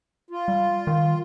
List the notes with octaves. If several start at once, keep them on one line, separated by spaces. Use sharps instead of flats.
F4
G3
D#3